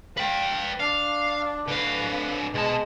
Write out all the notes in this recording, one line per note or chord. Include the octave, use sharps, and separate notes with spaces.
B4 F5 G5
D4 F5
D3 B4 F5
B2 G#3 A5